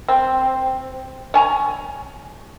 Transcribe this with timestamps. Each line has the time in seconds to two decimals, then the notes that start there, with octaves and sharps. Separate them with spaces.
0.08 C4
1.34 C#5 G#5 A#5